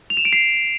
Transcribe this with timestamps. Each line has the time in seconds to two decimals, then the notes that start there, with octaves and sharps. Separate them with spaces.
0.10 F7
0.17 E7
0.25 D7
0.33 C7